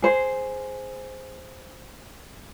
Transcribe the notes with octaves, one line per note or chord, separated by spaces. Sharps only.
G#4 C5